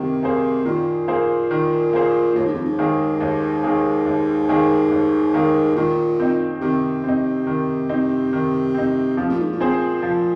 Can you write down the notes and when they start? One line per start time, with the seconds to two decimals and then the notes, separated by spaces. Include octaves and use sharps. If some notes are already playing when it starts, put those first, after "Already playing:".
Already playing: C3 D#3 A#3
0.23 A#3 G#4 C5
0.65 A#2 D#3
1.08 A#3 G#4 C5
1.51 D#3
1.93 A#3 G#4 C5
2.35 D#2 A#2
2.45 G#2
2.54 F2
2.65 G#2
2.79 D#3 A#3 G#4
3.20 D#2
3.64 D#3 A#3 G#4
4.06 D#2
4.49 D#3 A#3 G#4
4.91 D#2
5.34 D#3 A#3 G#4
5.76 A#2 D#3
6.20 C4 D#4
6.61 C3 D#3
7.04 C4 D#4
7.47 D#3
7.89 C4 D#4
8.33 D#3
8.75 C4 D#4
9.17 C3 F3
9.29 A#2
9.40 G#2
9.53 A#2
9.60 C4 G#4 C5
10.03 F3